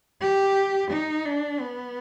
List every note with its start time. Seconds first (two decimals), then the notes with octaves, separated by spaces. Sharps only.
0.21 G4
0.91 D#4
1.25 D4
1.60 B3